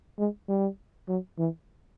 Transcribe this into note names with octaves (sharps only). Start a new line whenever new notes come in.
G#3
G3
F#3
E3